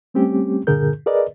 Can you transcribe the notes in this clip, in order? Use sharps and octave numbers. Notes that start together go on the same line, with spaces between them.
G3 A3 C4 C#4 G4
G2 A#2 D3 G#4 A#4 G6
G#4 A#4 B4 D5 D#5